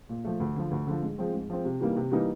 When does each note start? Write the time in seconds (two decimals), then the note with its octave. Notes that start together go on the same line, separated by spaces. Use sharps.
0.09 A#2
0.24 F3 A3
0.40 D2
0.56 D3 F3
0.71 D2
0.87 D3 F3
1.02 G#2
1.18 F3 G#3 C4
1.33 G#2
1.50 F3 G#3 C4
1.65 C3
1.81 E3 G3 A#3 D#4
1.96 C3
2.12 E3 G3 A#3 D#4